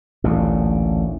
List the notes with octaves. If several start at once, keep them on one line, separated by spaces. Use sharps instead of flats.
A1 D2 A#2